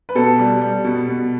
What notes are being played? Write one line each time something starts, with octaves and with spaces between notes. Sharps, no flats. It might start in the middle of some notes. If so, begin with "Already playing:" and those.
B4
B2 A4
G3
G3
B2
B2